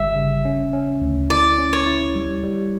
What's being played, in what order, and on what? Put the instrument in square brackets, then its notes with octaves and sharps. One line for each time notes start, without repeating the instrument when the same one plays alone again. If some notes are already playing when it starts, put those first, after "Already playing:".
Already playing: [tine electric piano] G1 G3 [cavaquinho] E5
[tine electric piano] C#3
C#4
C#4
D2
[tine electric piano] E4 [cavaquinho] D5
[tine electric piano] C#4
[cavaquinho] C#5
[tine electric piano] E4
G3
G3